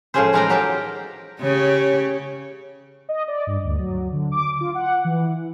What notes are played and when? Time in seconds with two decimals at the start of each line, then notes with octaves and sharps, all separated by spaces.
0.14 A2 F3 G#3 C#4 G#4 C5
0.33 E3 G#3 D#4 F5 G5 A#5
0.50 F#3 G4 A#4 G5 A5
1.41 C#3 G4 C#5
3.09 D#5
3.28 D5
3.47 G2
3.64 D2
3.79 F#3
4.12 D3
4.32 D6
4.61 F4
4.75 F#5
5.04 E3